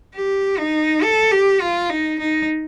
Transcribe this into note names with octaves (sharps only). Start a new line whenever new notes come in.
G4
D#4
A4
G4
F4
D#4
D#4